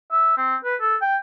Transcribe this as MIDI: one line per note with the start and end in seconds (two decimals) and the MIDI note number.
0.11 0.37 76
0.37 0.55 60
0.64 0.75 71
0.81 0.96 69
1.02 1.16 79